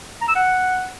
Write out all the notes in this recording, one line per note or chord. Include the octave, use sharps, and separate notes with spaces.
A#5
E6
F#5